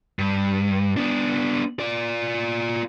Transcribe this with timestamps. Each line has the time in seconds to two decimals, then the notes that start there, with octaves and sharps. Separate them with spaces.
0.19 G2
0.97 B3 D4
1.80 F4 D5